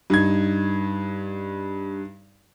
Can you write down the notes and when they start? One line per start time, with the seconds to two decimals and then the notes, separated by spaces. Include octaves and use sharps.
0.10 G2 D#4 G#6